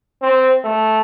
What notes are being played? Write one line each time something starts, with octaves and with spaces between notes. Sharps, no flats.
C4
A3